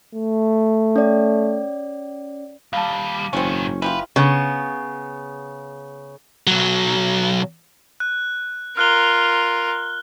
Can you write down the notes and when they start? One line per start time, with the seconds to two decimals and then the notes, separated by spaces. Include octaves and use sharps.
0.15 A3
0.96 C#4 D5
2.73 D#2 G3 F5 A5
3.33 F#1 G#2 D#3 C4 C#4
3.82 E3 G3 F4 B4
4.16 C#3 B3
6.47 B1 F#3
8.00 F#6
8.77 F4 A#4 F6 F#6 G7